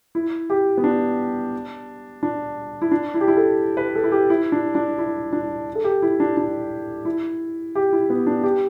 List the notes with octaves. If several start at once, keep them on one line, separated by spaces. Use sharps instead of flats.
E4
G4
B3
D4
D4
E4
D4
E4
G4
E4
A4
B4
A4
E4
G4
E4
D4
D4
E4
D4
A4
G4
E4
D4
D4
E4
G4
E4
B3
D4
G4